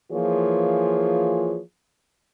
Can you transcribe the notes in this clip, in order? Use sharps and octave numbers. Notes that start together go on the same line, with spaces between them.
E3 F3 A#3 F4 G#4 C#5